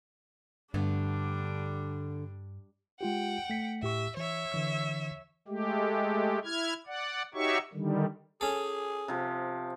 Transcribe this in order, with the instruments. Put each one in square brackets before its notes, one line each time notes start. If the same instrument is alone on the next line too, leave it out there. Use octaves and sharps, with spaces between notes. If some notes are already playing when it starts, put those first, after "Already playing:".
[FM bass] G2 [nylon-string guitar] D3 A3 B3 [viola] G3 D4
[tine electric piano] G#3 F4 G4 [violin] F#5 G5
[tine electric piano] A3 B6 C#7
[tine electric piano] A2 G4 C#6 [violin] E5
[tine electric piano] E3 [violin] C#5 E5
[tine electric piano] D3 E3 E6
[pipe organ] G#3 A3 G4
E4 F6 G#6
D5 F#5
D#4 F#4 G4 C#5 E5 C#6
D3 D#3 G3
[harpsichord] C#4 A4 [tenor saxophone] G#4
[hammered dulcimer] C3 F3